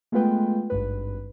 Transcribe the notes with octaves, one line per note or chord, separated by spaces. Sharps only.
G#3 A3 B3 F4 B4 G5
G#1 G2 B4